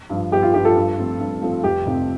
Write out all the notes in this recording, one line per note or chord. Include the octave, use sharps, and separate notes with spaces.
G2 F3
G1 G4
F4
G2 F3 G4
F4 A4
G2
F3 A3 C4
G2
F3 A3 C4
F1 G4
F2 C3 F3 C4